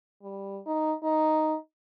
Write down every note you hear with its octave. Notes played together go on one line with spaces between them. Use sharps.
G3
D#4
D#4